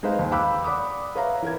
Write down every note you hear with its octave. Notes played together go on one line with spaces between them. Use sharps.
G#3 D#4 B4 C5 F5
D#2
F5 G5 B5 D6 E6 F#6
D5 F#5 B5 D6 D#6
B4 C#5 E5 F5 A#5
E3 A#4 G#6